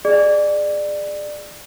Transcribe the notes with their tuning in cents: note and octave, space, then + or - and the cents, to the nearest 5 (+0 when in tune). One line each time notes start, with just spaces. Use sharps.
G#4 +0 D5 +20